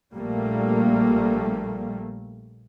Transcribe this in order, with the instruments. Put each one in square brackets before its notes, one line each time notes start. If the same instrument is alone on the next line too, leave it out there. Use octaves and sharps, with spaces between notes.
[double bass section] A#1 A#2 G3 A3 A#3